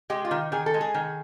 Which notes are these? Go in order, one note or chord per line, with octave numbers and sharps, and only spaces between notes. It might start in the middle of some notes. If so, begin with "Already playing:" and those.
G#3 G4
F4
D#3
D#3 G#4
A4
G#3
G#4
D#3